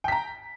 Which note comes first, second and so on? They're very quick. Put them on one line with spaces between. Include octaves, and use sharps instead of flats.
G5 B6 A#5